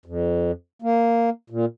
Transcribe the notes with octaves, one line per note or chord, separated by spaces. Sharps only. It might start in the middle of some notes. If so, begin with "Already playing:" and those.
F2
A#3
A#2